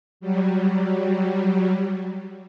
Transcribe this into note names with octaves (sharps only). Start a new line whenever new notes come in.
F#3 G3